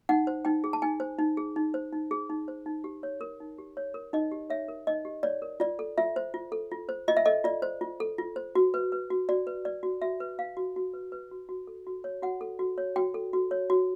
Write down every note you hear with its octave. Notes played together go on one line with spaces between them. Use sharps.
D#4 F#5
C5
D#4 G5
G#4
A5
D#4 G#5
C5
D#4
G#4
D#4
C5
D#4
G#4
D#4
C5
D#4
G4
C#5
A#4
D#4
G4
C#5
A#4
D#4 D#5
G4
C#5 E5
A#4
D#4 D#5
G4
C#5 D5
A#4
F4 D5
A4
F4 E5
C5
F4
A4
F4
C5
F4 D#5
E5
A4 D#5
F4 D5
C5
F4
A4
F4
C5
F#4
B4
B4
F#4
F#4 D5
B4
B4 D5
F#4
F#4 E5
B4
B4 F5
F#4
F#4
B4
B4
F#4
F#4
A4
F#4
C#5
F#4 F#5
A4
F#4
C#5
F#4 G5
A4
F#4
C#5
F#4